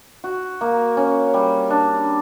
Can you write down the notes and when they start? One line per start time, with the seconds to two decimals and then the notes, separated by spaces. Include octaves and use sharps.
0.24 F#4
0.61 A#3
0.97 C#4
1.34 G3
1.70 D4